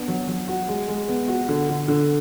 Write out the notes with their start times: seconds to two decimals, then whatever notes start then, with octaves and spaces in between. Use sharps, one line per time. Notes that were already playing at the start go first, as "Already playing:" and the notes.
Already playing: B3 D4
0.08 F#3
0.28 F#3
0.48 F#4
0.68 G#3
0.88 G#3
1.08 B3
1.28 F#4
1.49 D3
1.69 D3
1.88 D3